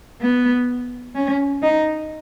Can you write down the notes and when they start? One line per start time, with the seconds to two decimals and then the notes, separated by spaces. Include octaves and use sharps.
0.21 B3
1.15 C#4
1.62 D#4